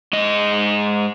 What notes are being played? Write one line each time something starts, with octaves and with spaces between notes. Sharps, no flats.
G#2 D#5